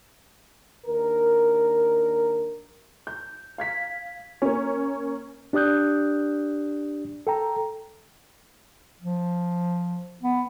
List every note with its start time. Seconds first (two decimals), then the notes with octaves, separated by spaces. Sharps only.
0.86 D#2 D4 A#4
3.07 G6
3.58 F5 G#6 B6
4.42 A#3 C#4
5.53 D4 G4 D5 D#6 F#6 G6
7.27 A4 G5 A#5
9.02 F3
10.23 B3